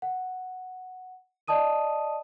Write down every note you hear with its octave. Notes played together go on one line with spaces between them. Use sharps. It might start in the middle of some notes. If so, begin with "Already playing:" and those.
F#5
D5 D#5 A5 D#6 D#7